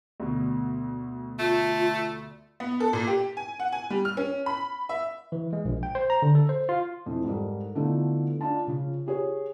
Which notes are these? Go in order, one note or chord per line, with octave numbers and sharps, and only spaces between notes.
D2 B2
A3 F4
B3
A4
A#2
G4
G#5
F#5
G#5
G3
F6
C#4
B5
E5
E3
G#3
A#1
G5
C5
A#5
D3
A4
C5
F4
F2 E3
G#2 G3 A4 A#4
D3 E3 F3 A3 B3 D#4
D4 D#4 F4 A5
C#3 F3 C#4
G4 G#4 C#5